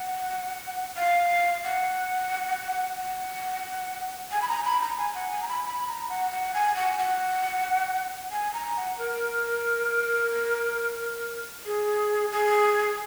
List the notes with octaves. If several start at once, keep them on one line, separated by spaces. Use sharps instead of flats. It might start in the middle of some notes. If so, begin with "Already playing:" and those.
Already playing: F#5
F5
F#5
F#5
G#5
B5
A#5
B5
A#5
G#5
F#5
G#5
A#5
B5
B5
A#5
F#5
F#5
G#5
F#5
F#5
G#5
A#5
F#5
A#4
G#4
G#4